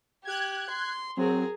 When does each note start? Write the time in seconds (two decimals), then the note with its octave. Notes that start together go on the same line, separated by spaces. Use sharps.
0.25 G4 F#6 G#6
0.70 C6
1.17 F#3 C4 G#4 A#4